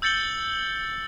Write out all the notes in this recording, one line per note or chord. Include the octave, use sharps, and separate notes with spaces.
E6 G6 A6 C#7 F#7 G7